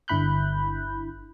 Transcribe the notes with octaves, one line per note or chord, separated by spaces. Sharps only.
G1 D3 E4 B5 F#6 G6